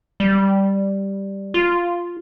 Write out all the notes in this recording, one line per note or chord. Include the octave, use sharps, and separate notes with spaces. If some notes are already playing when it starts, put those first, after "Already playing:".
G3
F4